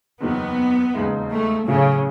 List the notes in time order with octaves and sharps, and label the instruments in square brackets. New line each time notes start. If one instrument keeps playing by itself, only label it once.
[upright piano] F#1 E2 D#3 F#3 [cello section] B3
[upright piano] E1 D#2 C#3 G#3 D#4
[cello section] A3
[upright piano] A2 F#3 A3 [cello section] C#3